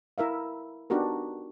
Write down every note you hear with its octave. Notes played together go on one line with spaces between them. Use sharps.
E4 A#4 E5 F5
B3 D4 D#4 F#4 G4 A#4